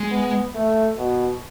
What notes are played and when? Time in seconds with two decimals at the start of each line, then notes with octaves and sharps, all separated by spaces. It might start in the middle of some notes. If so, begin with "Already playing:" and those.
Already playing: G#3
0.11 B3
0.55 A3
0.98 B2